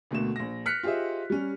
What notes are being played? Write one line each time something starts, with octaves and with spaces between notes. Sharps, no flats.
D2 B2 A3 A#3 E7
A#1 A#6
F6 F#6 B6 C#7
F4 G4 G#4 C5 D#5 E5
G3 C#4